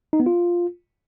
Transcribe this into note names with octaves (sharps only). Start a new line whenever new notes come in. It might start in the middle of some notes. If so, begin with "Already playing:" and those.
D#4
B3
F4